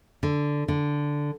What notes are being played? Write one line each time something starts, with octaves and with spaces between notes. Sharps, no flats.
D3
D3